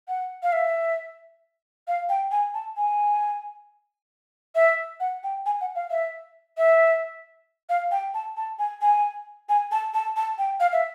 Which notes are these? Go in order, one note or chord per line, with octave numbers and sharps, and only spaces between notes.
F#5
F5
E5
F5
G5
G#5
A5
G#5
E5
F#5
G5
G#5
F#5
F5
E5
E5
F5
G5
A5
A5
G#5
G#5
G#5
A5
A5
A5
G5
F5
E5